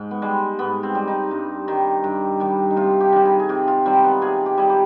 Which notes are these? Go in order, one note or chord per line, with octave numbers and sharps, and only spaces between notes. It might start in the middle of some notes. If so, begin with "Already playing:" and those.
Already playing: G#2
B3
G3 G#3
G#2 B3
C4
G3
D#4
G2
D#3 G3
G2
D#3 G3
D#4
C3 F4
G4
D#3 G3
G#4
G#4
C3 G4
F4
D#3 G3 C4
B3
C3 G#4
G4
G3 G#4
G4